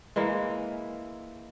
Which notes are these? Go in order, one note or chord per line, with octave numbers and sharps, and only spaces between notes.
E3 G#3 A#3 E4